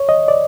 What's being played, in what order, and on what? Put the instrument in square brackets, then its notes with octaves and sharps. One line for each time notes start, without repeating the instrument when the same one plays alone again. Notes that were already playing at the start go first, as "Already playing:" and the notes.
Already playing: [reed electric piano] C#5
D#5
D5